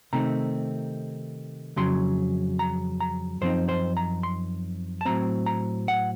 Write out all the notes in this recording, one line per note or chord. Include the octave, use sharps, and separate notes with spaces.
C3 D#3 A3 C4 D#4 A#5
F2 C#3 F#3 C6
A#5
A#5
F#2 F3 C4 D#4 C5
C5
A#5
C6
A5
A2 F#3 C4 A#5
A#5
F#5